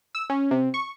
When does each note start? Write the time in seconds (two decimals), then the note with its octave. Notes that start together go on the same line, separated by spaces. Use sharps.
0.15 E6
0.30 C#4
0.51 C3
0.74 C#6